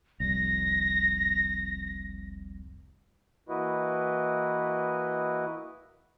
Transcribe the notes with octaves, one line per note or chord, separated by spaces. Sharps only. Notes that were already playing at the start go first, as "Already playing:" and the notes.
F1 C2 A#6
E3 A#3 E4 F#4 B4 D#5